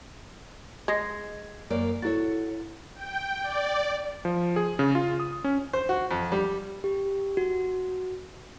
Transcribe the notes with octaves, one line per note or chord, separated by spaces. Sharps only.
G#3 G#6 A#6 C7
F#2 A#3 C#5 D5
E4 F#4 A4 C#5 A6
G5
D5
F3
G#4
C#3
F4
D#6
C#4
C5
F#4
F2
G3
G4
F#4